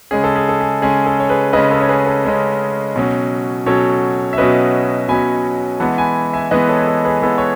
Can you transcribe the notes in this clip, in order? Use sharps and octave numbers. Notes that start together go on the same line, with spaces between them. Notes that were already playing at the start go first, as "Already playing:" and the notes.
C#3 G#3 C#4 G#4
A4
G#4
A4
G#4
C#3 G#3 C#4 G#4
A4
C#5
G#4 B4
C#3 G#3 C#4 B4 D#5
A4 C#5
C#5
G#4 B4
A4
C#3 G#3 C#4
B2 F#3 C#4
B2 F#3 C#4 A4 C#5
E5
B2 F#3 C#4 B4 D#5
B2 F#3 C#4 G#5 B5
E3 G#3 B3 F#5 A5
G#5 B5
E5 G#5
E3 G#3 B3 B4 D#5
A4 C#5
G#4
A4
G#4 B4
E3 G#3 B3 A4
C#5